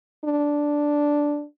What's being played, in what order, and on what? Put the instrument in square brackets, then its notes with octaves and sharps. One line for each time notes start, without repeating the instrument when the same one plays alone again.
[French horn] D4